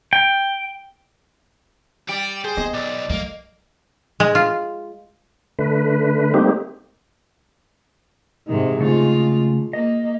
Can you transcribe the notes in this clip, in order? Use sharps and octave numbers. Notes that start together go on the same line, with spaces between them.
G5
G3 D5 D7
G#4 C5
B3 D#5
B1 D5
F#3 A3 A#3
G#3
F4
D3 A3 B4
G3 A3 A#3 C4 D#4 G4
G#2 C3 D#3
C#3 G#3 A3 F4
A#3 D#5